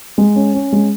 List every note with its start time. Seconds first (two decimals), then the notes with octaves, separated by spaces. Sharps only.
0.18 G#3
0.36 C#4
0.54 C#4
0.72 G#3